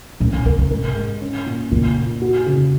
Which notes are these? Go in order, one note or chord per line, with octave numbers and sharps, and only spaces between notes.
A#2 C#4
D#3
C#3 A#4
C#3
G#2 A#4
G#3
C#4
A#2
A#2 C#3
A#2
F#4
C#3